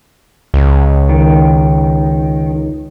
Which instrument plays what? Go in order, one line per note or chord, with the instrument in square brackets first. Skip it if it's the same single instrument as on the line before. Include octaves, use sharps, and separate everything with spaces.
[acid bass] C#2
[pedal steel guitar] D#3